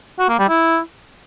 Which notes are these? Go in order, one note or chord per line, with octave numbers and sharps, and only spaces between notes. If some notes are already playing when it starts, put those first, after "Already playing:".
F#4
A#3
G3
E4